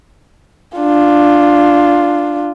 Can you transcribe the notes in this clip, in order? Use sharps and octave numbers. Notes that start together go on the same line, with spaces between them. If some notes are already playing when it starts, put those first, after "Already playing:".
D4 F4